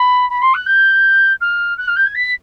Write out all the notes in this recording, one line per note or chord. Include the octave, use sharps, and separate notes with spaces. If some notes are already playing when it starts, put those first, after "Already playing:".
Already playing: B5
B5
C6
F#6
G6
F6
F#6
F6
G6
G#6
B6